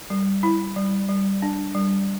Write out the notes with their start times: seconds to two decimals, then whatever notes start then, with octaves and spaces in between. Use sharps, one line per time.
0.10 G3
0.43 E4
0.76 G3
1.09 G3
1.42 D4
1.75 G3